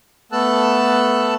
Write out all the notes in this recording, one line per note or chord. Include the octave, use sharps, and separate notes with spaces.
A3 B3 A4 A5 E6 F#6